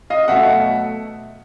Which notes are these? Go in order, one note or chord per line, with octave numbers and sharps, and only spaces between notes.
D#5 F5
B2 F#3 A3 E5 F#5